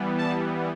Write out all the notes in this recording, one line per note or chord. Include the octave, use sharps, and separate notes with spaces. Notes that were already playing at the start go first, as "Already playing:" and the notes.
Already playing: E3 G3 B3
A5